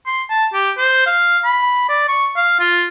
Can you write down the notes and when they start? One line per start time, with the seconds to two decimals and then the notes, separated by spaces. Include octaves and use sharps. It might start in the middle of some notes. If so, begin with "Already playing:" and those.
0.07 C6
0.30 A5
0.54 G4
0.78 C5
1.06 F5
1.45 B5
1.89 D5
2.08 C#6
2.36 F5
2.60 F4